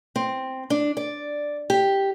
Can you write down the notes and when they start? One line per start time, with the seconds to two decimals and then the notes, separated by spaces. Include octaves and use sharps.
0.16 C4
0.70 D4
0.97 D5
1.70 G4